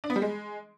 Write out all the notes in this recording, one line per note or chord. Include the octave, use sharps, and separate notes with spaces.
D4
B3
G3
G#3